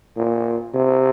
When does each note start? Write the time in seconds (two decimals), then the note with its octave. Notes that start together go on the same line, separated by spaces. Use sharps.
0.16 A#2
0.75 C3